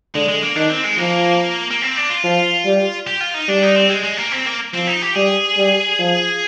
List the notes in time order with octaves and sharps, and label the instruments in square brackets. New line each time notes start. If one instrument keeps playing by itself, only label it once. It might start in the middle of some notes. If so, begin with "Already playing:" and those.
[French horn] D3 [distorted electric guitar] G#3
[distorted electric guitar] G#3
A#3
[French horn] D#3 [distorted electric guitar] D4
[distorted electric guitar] C4
G#3
[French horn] F3 [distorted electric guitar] A#3
[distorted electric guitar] A#3
C4
D4
F4
[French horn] F3
G3
[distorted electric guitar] G4
F4
D#4
[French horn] G3 [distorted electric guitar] D4
[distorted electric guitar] D#4
C4
G#3
G#3
A#3
C4
A#3
[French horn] F3 [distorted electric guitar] C4
[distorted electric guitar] D#4
G4
[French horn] G3 [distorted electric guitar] G#4
[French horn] G3
F3